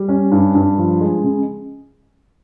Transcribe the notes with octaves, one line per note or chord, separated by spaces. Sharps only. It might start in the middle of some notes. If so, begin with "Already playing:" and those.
Already playing: G3
C#4
G2
G2
F3
G#3
C#3